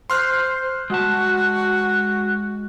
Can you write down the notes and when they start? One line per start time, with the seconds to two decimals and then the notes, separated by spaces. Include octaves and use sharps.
0.10 C5 C6 F6 F#6
0.90 G#3 F#4 A5